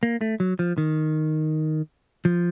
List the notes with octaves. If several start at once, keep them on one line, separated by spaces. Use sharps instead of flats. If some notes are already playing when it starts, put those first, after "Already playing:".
A#3
A3
F#3
F3
D#3
F3